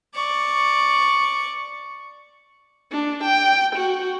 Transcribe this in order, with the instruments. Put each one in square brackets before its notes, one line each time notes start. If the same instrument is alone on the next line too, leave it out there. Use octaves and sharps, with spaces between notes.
[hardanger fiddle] D5 C#6
[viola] D4
G5
F#4